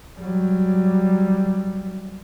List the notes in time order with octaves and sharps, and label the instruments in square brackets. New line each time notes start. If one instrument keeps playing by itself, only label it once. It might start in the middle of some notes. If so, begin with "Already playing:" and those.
[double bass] F#3 G3